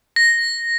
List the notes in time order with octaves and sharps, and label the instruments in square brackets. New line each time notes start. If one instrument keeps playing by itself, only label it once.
[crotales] A#6